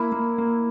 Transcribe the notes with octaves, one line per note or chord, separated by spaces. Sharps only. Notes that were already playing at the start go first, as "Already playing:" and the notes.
Already playing: A#3 E4
A#3
A#3